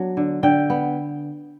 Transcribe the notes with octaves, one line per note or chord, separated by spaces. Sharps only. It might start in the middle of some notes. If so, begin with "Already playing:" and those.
Already playing: F#3 B3 D4
D3
D3 G5
B3